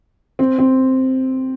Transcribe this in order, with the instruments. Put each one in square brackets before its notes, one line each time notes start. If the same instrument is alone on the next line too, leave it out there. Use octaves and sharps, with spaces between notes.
[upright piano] C4
C4